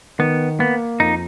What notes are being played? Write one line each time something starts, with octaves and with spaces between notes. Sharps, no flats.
D#3 B3
A#3 B3
F2 D#4